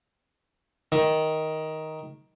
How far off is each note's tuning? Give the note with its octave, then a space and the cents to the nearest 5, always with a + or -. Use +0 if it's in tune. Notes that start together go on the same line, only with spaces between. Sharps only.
D#3 +10